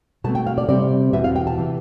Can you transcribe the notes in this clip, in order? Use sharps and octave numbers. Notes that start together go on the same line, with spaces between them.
B2 A3 C4 A5
G5
F5
D5
C3 G3 C4 D5
E2 B2 B3 E5
F5
G5
A5
C3 E3